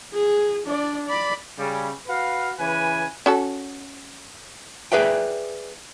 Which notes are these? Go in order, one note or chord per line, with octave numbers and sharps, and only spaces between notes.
G#4
D4 D5
D5 B5
C#3 G3
F#4 B4 F5
C#3 E3 B4 G#5
C#4 F#4 A4
G#4 B4 D5 E5 G5